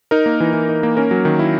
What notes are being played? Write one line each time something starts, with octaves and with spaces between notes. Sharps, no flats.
D#4 A#4
A#3
E3
E3
D#4
A#3
C#4 A#4
F#3
D#3
E4